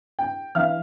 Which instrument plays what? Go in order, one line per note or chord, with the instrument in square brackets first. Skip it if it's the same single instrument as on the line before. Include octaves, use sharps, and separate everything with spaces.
[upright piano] G5
[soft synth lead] E3 [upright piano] E5 F5 F6